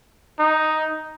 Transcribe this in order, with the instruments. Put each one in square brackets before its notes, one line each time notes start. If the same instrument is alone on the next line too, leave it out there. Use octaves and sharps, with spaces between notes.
[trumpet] D#4